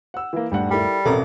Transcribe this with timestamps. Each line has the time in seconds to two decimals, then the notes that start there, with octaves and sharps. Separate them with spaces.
0.14 F#5 E6
0.33 E3 A#3
0.52 D#1 G2 G3 A3 D4 F#5
0.70 G3 E4 A4 A#4
1.05 A1 F2 B2 A4 A#4 A#5